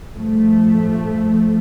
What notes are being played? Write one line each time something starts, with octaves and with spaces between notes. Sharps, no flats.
G2 F3 A3